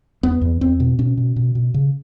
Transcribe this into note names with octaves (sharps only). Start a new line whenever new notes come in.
E2 B3
E2
E2 C4
B2
B2 C#4
B2
B2
B2
C#3